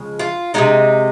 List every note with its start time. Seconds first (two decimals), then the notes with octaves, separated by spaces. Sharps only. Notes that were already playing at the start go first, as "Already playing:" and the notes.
Already playing: C#3 F3 G#3
0.19 F4
0.54 C3 F3 G#3 D#4